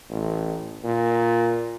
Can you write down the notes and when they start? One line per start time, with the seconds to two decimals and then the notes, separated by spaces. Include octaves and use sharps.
0.10 A1
0.84 A#2